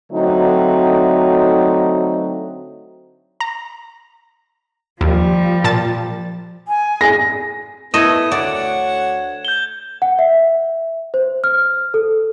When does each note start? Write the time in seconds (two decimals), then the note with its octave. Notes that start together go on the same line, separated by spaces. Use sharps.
0.12 D3 F#3 A3 C4 D#4
3.40 A#5
5.01 D#2 F3 G3
5.64 A#2 A5 A6
6.68 G#5
7.01 A#6
7.94 A3 B3 E4 D#5 G#6 E7
8.32 D2 C#5 D5 F#5
9.45 G6 G7
10.02 F#5
10.19 E5
11.14 C5
11.44 F6
11.94 A4